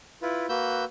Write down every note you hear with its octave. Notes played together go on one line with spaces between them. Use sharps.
E4 F4 B4
A#3 F#4 B4 E6 G6